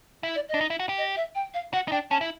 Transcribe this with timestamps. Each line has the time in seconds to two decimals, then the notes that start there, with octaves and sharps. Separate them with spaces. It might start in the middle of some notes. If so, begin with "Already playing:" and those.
0.23 E4
0.35 D5
0.49 D#5
0.54 D4
0.61 D#4
0.70 E4
0.80 F#4
0.89 G4
0.98 D#5
1.16 E5
1.35 G5
1.54 F5
1.73 F#4 F#5
1.88 D#4
1.92 D4 G5
2.11 C#4 A5
2.21 E4